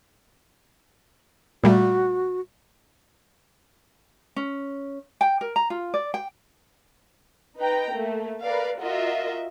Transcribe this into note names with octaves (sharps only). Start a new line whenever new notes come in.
A#2 G3 A3 F#4
C#4
G5
A#4
A#5
F4
D5
G5
D#4 B4 G5 A#5
A3 A#3
A#4 B4 D5 F5
F4 F#4 A#4 D#5 E5